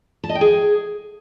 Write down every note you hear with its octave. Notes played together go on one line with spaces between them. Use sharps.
A5
D#5
G5
G#4